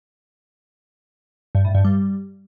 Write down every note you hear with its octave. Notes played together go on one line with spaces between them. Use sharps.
G2
A2
G2
G3